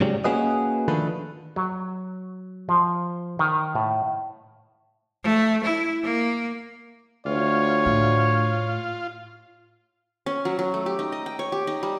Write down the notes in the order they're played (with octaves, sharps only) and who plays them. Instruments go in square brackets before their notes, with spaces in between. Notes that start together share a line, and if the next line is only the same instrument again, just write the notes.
[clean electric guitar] G#2 C#3 F#3 G3
A#3 C#4 F#4 G#4 B4 D#5
D3 D#3 F3 A3 A4 B4
[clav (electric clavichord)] F#3
F3
D#3
A2
[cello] A3
E4
A#3
[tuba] D2 [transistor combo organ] F4 [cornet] C#5
[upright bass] A2
[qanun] C#4
F#3
F#3
A3
G4
D#4
D#5
G5
C#5
G4
D#4
G3